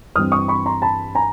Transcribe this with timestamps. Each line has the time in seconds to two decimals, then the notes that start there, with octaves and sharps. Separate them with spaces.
0.16 G2 E3 G3 C4 D#6 F6
0.32 C#6 D#6
0.48 B5 C#6
0.66 A#5 C6
0.82 A5 B5
1.15 G#5 A#5